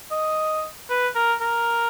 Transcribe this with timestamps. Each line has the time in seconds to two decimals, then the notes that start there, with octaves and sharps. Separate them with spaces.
0.11 D#5
0.90 B4
1.15 A#4
1.41 A#4